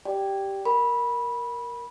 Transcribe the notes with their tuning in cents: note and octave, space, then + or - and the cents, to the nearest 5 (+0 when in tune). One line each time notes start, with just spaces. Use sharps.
G4 -5 D5 +0 G5 +0
A#4 +0 B5 -20